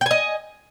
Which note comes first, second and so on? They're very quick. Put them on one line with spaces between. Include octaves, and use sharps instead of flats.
G5 G#5 D#5